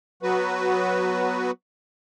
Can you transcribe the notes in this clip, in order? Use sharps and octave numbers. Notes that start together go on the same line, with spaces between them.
F#3 B3 F#4 B4